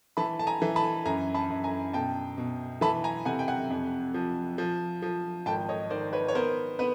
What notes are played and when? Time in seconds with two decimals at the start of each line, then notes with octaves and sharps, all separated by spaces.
0.17 E3 A5 B5
0.39 A5
0.47 G#5 A#5
0.62 E3
0.76 A5 B5
1.06 F#2 G#5 A#5
1.34 A5 B5
1.50 F#2
1.64 G#5 A#5
1.93 B2 G5 A5
2.38 B2
2.81 E3 A5 B5
3.04 G#5 A#5
3.25 C3 F#5 G#5
3.39 G5
3.48 F#5 G#5
3.70 F2
4.14 F3
4.58 F3
5.02 F3
5.46 G#1 G5 A5
5.69 C#5 D#5
5.90 D#3 C5 D5
6.13 B4 C#5
6.28 C#5
6.35 B3 A#4 C5
6.79 B3 B4